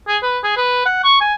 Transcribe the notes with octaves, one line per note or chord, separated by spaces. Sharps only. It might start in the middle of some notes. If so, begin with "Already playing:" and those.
G#4
B4
G#4
B4
F#5
C#6
G#5